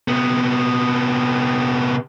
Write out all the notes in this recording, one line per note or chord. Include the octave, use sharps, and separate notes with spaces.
C3 B3